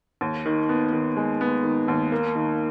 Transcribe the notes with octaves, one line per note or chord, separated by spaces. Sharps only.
D#2
D#3
B3
D#3
G#3
B3
D#3
D#2
A#3
D#3